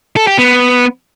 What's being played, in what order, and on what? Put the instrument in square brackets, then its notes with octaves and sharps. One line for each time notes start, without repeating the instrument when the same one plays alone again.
[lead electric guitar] A4
G4
B3